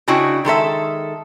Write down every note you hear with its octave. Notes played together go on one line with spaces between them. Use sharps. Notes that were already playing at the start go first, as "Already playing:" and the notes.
C#3 D4 E4 F#4 D#5 G5
D#3 G#3 A4 E5